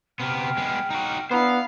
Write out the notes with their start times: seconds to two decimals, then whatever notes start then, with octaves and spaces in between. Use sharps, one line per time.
0.20 C3 B3 G5 F6
0.57 G#3 B3
0.90 D#4 F#4
1.31 B3 D4 E4 C5 F5 A#5